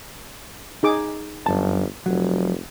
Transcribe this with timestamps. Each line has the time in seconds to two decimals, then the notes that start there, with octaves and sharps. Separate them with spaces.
0.83 D#4 G#4 D6
1.46 G1 F#2 A5
2.06 F1 F#3